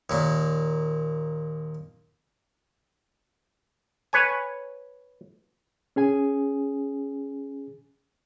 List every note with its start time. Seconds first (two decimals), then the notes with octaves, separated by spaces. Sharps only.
0.10 D#2 A#2
4.13 B4 C#5 G#5
5.96 C#4 G#4 G#5